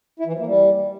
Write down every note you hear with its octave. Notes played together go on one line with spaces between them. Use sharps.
E4
E3
F3
A#3
G3